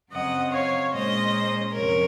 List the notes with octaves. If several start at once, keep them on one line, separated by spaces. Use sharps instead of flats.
F#2 C#3 F#3 C4 D#5 F#5
C#5 F5
A#2 G#3 C#4 C5 D#5
F2 C3 F#3 C#4 A#4 C#5